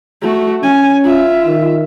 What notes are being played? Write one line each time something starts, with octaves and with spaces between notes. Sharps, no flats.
A3 F#4
C#4 G#5
F4 E5
D#3